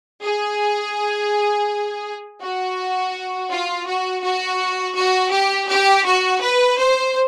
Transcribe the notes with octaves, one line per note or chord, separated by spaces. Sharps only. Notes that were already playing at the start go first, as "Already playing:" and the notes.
G#4
F#4
F4
F#4
F#4
F#4
G4
G4
F#4
B4
C5